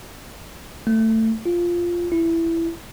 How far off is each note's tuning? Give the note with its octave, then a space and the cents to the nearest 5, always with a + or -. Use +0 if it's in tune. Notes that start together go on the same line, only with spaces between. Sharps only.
A3 +20
F4 -5
E4 +10